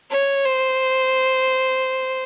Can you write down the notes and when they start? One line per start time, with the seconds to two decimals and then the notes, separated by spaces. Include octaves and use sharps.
0.11 C#5
0.45 C5